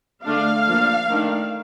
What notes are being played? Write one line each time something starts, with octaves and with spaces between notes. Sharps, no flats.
D3 A3 D4 F5
F3 A#3 D4
D#3 A3 D4